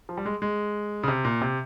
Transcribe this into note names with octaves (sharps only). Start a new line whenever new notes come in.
F3
G3
G#3
G#3
C#3
C3
A#2
C3